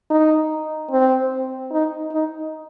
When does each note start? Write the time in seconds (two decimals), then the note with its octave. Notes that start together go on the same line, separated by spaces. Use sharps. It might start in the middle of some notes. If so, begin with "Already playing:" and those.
0.11 D#4
0.91 C4
1.72 D#4
2.11 D#4